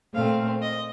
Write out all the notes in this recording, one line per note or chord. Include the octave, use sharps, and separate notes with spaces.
A#2 A3 C4 F5
D#5